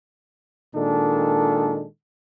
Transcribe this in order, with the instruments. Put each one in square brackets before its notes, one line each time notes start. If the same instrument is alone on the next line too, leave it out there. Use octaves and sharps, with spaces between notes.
[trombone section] A#2 D#3 G#3 D4 A4